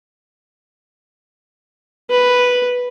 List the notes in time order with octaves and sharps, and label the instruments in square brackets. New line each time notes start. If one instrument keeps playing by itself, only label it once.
[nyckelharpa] B4